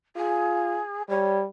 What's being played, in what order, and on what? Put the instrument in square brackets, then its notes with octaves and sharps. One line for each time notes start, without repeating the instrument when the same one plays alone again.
[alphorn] F4 [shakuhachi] G#4
[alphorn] G3 [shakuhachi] C#5